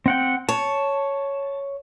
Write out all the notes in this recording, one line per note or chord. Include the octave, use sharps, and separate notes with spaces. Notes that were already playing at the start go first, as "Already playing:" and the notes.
C4 F#5 G5
C#5 A5